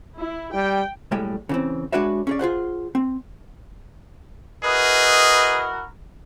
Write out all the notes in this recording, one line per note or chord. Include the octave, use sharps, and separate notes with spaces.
E4
G3 G5
B1 A2 G3 G#3 G5
C#3 E3 C4
G#3 D4 F#4 B4 C#5 E5
C#4 G#4 D5
F4 G#4 C5 F#5
C4
E4 F#4 G#4 A#4 B4 D#5